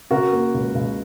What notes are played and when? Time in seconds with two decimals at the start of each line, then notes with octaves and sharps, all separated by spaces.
0.11 C#3 F#4 A#4
0.32 A#3
0.54 C#2
0.75 C#2